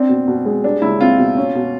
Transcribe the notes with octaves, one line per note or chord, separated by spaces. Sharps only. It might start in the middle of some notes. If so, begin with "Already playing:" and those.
Already playing: C4 D4
B2
B2
G#3
G3 D4
C#2 E4
C4 F4
B2
C#4
B2